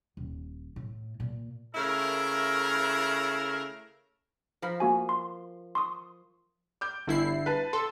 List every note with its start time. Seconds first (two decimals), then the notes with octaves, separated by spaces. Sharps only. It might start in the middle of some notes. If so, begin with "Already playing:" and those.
0.17 D#1
0.76 A2
1.20 A#2
1.75 C#3 A3 E4 A#4
4.62 F3 A#4 B5
4.80 A#3 F#4 G#5
5.09 C6
5.75 C6 C#6 D#6
6.81 D6 G6
7.07 G1 D3 E4 C7
7.46 B4 A5
7.73 A4 C6